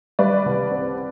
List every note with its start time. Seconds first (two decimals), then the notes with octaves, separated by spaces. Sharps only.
0.19 G3 B4 D5
0.46 C2
0.71 C4